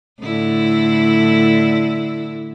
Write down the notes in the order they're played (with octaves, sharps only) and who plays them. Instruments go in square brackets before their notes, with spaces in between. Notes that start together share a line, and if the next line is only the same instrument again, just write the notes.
[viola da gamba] A2 D3 E4